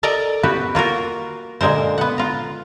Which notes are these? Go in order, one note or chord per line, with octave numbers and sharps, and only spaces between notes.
A4 A#4 D5 D#5 A#5
B3 F#4 G4 B4
A#3 F4 F#4 A#4
A#2 D3 G#3 A#4 C5
B3 F#5
F4 A#5